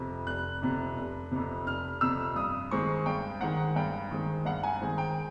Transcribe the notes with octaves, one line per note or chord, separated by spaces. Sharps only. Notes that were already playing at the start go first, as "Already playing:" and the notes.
Already playing: F2 C3
F1 F#6
F2 C3
F1
F2 C3
F1 F6
F2 C3 E6
G2 D#6
D#3 G#3 C4 C#6
G2 G5
D#3 G#3 C4 F#5
G2 G5
D#3 G#3 C4
G2 F#5
G#5
D#3 G#3 C4
G5